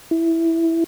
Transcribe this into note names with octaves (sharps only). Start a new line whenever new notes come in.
E4